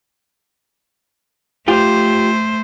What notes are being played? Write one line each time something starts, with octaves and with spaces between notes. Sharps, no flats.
A3 F4 G4 C5